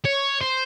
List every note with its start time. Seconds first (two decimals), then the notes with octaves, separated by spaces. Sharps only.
0.05 C#5
0.41 C5